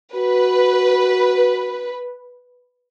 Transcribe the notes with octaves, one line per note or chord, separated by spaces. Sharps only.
F#4 B4